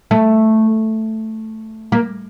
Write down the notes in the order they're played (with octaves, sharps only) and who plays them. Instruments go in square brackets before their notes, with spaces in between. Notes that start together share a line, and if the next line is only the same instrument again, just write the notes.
[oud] A3
A#3